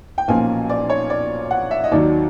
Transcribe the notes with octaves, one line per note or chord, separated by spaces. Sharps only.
G5
B1 A#2 F3 A#3 C#4 G#5
D5
C#5
D5
F#5
E5
D#5
D#2 D#3 F#3 D5